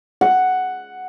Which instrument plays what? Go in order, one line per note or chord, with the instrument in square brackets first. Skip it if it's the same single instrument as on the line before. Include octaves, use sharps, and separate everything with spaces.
[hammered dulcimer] F#5